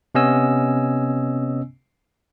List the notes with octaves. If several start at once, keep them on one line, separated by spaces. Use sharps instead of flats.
C3 B3 C#4 D#5 G#5 E6